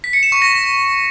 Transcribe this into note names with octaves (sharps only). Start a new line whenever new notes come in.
B6
C#7
E7
C#6
A#6